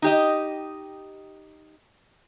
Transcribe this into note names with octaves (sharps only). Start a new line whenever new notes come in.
D#4 G4 D#5